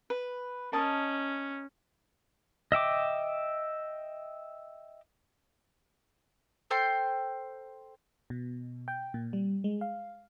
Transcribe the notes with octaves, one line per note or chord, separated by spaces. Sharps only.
B4
C#4 A#4 D#5 A5
D#5 E5 G5 D6
A4 C5 G5 C6
B2
G5
A#2
G3
G#3
F5